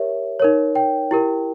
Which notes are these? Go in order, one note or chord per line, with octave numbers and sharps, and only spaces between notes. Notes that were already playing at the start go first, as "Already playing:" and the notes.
Already playing: G4 A#4 C#5 E5
D#4 A#4 C#5
G5
E4 G4 A#4